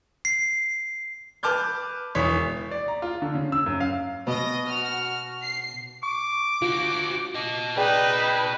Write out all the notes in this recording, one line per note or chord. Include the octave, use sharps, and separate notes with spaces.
C7
B4 A5 D6 F6 G6
E1 E3 C#5 D#6 B6
D5
A#5
F4
D3
C#3
E6
F#2
F5
B2 B3 D#5 D#6 A#6
F#4 F6
C7
C#6 D6
D3 F4 F#4
F#4 D#5
D#4 G#4 B4 D5 G5